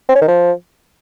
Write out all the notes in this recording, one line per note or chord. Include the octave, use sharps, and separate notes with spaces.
C4
C#4
D#3
F3